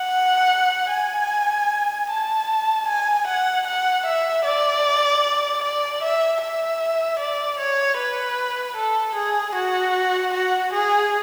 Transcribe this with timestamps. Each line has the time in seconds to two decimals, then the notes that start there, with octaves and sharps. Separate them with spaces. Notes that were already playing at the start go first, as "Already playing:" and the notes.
Already playing: F#5
0.92 G#5
2.10 A5
2.88 G#5
3.28 F#5
3.67 F#5
4.06 E5
4.45 D5
5.64 D5
6.03 E5
6.42 E5
7.20 D5
7.59 C#5
7.98 B4
8.77 A4
9.16 G#4
9.56 F#4
10.34 F#4
10.73 G#4